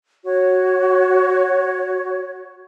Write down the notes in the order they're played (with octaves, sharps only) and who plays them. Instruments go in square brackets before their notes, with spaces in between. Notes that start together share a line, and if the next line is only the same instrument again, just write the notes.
[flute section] F#4 C#5